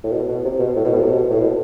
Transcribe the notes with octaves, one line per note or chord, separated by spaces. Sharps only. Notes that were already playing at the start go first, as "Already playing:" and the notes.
A2
B2
B2
C3
B2
A2
B2
A2
C3
B2
A2
B2